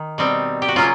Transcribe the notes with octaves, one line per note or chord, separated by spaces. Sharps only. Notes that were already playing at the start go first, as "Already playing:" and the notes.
Already playing: D#3
B2 G3 C4 D#4
G4
F#4
C#3 F#3 A#3 C#4 F4